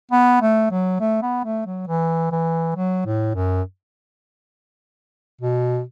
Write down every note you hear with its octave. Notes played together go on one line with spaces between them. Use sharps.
B3
A3
F#3
A3
B3
A3
F#3
E3
E3
F#3
A2
F#2
B2